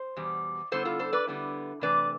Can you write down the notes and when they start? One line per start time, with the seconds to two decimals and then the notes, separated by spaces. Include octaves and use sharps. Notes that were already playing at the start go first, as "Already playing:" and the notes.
Already playing: C5
0.16 E2 B2 G3
0.72 D3 G3 B3 E4 A4 C5
0.85 F4 A4
0.99 A4 C5
1.13 B4 D5
1.27 D3 G3 B3 E4
1.81 C3 E3 A3 D4 B4 D5